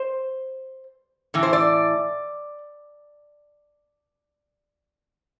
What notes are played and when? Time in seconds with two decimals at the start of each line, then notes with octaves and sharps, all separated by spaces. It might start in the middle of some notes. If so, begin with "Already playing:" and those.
Already playing: C5
1.34 A2 E3
1.43 C5
1.53 D5